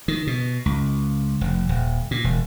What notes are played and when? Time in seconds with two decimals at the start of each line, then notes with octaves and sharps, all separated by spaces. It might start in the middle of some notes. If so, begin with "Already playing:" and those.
0.08 D#3
0.27 B2
0.66 C#2
1.41 F1
1.69 D#1
2.11 A#2
2.24 E1